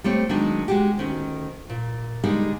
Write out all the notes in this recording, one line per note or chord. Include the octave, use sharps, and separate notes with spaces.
G3 A3 C4 C#5
D#3 F#3 G#3 A#3 D4 D#4
G#3 F#4 G4
D2 D#3 C#4
A#2
D3 G3 G#3 D#4 A#4